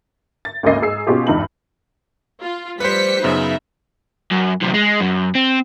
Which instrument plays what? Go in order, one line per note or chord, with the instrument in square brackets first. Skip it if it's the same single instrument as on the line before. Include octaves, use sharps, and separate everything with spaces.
[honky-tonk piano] A6
G#1 D2 C#3 A#3 D#5 C7
G#2 G#4 E6 C7
B2 C#4 F4 G4 G#4
G#1 E2 G2 D#4 B5 F#7
[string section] F4
[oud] F3 A3 [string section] G3 B6 C#7 [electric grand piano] B4 C5
[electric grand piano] F#2 C#3 B3 [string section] D#4 E5 B5
[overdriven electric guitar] F#2
F#2 C3
G#3
F#2
C4